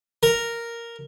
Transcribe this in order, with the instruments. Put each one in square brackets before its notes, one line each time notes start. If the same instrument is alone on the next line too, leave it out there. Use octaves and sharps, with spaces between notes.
[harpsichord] A#4